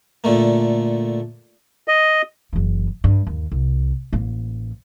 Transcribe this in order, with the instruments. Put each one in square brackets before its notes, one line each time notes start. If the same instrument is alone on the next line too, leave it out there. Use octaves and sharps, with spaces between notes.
[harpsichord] A#2 D3 A3 A#3
[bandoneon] D#5
[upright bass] F#1 E3
G2
D#2
C2
A1 A#3